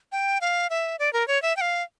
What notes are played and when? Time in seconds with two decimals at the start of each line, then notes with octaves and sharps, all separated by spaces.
0.12 G5
0.41 F5
0.70 E5
0.99 D5
1.13 A#4
1.28 C#5
1.42 E5
1.57 G5
1.61 F5